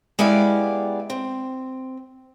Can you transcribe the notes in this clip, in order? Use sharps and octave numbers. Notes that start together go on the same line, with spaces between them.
G#3 B3 E4 G4 D5 F5
C4